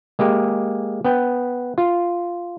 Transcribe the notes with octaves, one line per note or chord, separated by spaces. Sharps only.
G#3 A#3 G4
B3 G5
F4